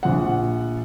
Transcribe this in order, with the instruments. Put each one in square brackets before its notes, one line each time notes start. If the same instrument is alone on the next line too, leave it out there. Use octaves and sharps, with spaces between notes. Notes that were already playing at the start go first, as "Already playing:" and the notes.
[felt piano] A#1 F#5